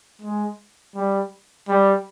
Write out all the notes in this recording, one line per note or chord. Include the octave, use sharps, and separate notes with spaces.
G#3
G3
G3